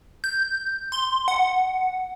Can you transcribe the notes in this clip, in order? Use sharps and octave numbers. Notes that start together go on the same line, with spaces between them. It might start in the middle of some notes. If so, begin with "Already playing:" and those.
G6
C6
F#5